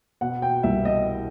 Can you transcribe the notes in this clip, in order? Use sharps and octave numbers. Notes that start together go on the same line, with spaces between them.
B2 F#5
G5
C2 E5
D#5